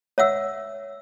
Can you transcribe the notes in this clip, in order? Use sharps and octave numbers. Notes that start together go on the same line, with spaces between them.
C#5 E5 F#5 E6